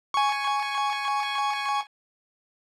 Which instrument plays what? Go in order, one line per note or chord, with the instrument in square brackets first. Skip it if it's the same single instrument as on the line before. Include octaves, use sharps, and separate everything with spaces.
[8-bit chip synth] G#5 C#6